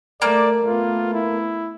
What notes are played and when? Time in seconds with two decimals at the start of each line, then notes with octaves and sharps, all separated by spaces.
0.22 A3 A#3 D5
0.64 A3 B3 F4
1.14 E4